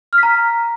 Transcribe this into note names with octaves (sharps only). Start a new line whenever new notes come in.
F6
B6
A#5